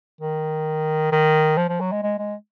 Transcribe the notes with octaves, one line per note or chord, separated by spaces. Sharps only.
D#3
D#3
F3
F3
F#3
G#3
G#3
G#3